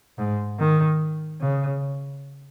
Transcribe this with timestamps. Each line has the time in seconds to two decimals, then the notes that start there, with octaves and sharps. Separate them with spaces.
0.18 G#2
0.59 D#3
1.40 C#3